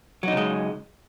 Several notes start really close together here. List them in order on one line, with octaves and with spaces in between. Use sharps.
F#3 D#4 C#3 G#3